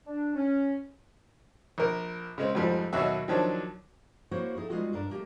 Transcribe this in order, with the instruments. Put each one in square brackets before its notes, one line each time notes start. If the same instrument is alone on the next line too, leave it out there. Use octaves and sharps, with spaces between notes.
[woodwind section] D4
C#4
[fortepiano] A#1 A#4
C#3 G#3 C4
F2 G#2 F3 G3
D#2 B2 F#3 F#4 E5
D#3 F3 F#3 C4 D4
[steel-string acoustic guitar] A#3 E4 F#4 C5 C#5
D#4 E4 G#4 A4
G3 G#3 B3 D#4 F4 F#4
G2 D4 A#4
G3 A3 A#3 F4 G4